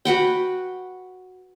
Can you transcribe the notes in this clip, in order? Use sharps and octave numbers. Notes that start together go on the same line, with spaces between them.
F#4 B4 F#5 G5